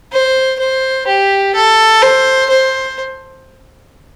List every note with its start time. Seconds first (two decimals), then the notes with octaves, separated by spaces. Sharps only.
0.13 C5
0.60 C5
1.07 G4
1.55 A4
2.02 C5
2.50 C5